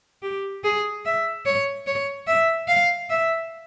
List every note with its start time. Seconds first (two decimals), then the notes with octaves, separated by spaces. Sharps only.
0.23 G4
0.64 G#4
1.05 E5
1.45 C#5
1.87 C#5
2.27 E5
2.68 F5
3.10 E5